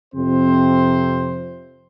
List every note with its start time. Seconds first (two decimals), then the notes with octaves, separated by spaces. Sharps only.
0.14 F2 C3 C4 C5